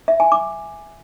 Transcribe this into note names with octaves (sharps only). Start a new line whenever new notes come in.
E5
G#5
D6